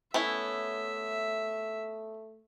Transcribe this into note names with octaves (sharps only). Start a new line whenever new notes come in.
A3 B3 C#4 E4 E5